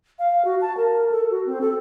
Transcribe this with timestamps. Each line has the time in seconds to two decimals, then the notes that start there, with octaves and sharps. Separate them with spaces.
0.19 F5
0.45 F#4
0.61 A5
0.77 A#4
1.11 A4
1.31 F#4
1.46 C4
1.61 A4